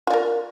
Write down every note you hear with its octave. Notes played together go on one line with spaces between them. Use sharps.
F4 A#4 D5